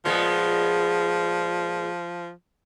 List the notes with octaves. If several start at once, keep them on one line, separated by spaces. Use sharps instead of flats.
A#2 F3 G#3 B3